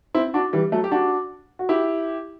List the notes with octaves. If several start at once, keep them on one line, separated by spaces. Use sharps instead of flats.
C4 E4
D4 F#4
E3 G3
F#3 A3
G4
D4 F#4
F#4
E4 G4